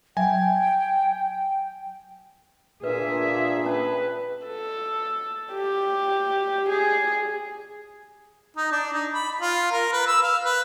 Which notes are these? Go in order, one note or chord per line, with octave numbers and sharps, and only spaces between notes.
F#3 E5 G5 G#5
A#2 D4 G#4 B4 E5
C#4 B4 A5
A4
G4
G#4
D#4
D4
D#4
B5
F4
A#4
B4
E6
F5
B4